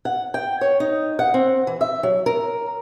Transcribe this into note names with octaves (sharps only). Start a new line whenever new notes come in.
F#5
G5
C#5
D#4
F#5
C4
E3
E5
F#3
A#4